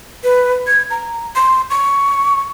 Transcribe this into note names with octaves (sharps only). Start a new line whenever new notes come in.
B4
G#6
A#5
C6
C#6